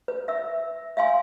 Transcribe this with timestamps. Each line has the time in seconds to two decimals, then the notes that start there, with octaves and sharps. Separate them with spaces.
0.08 B4
0.28 E5 E6
0.97 E5 F5 G#5 C6